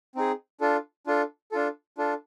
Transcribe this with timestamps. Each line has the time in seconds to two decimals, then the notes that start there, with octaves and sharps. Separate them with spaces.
0.15 C4 D#4 G#4
0.61 D4 F4 A4
1.07 D4 F4 A4
1.52 D4 F4 A4
1.98 D4 F4 A4